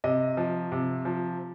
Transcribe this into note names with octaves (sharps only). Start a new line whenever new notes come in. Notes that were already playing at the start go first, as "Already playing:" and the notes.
C3 D#5
F3
C3
F3